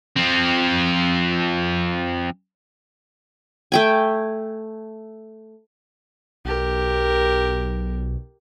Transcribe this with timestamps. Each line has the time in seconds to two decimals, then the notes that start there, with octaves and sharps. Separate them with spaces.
0.16 F3 C4
3.72 A3 G5 G#5
6.45 B1 G4 A#4